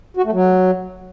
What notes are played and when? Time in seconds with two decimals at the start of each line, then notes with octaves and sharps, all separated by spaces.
0.17 F#4
0.25 A3
0.33 F#3